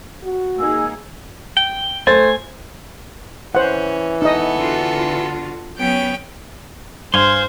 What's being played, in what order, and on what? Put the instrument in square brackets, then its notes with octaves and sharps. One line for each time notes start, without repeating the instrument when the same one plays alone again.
[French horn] F#4
[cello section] A#3 D#4 G#4 [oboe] E6
[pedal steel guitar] G5
[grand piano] A3 C5 A6 [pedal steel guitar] G#5
[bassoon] E3 [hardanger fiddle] C#4 [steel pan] C5 F#5
[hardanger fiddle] B3 A4 [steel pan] D#4 D#5
[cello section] D3 F4 F#4
[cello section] F#3 B3 [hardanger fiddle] C#4 G5
[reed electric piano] G2 [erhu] C5 [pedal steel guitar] F5 G#5 C6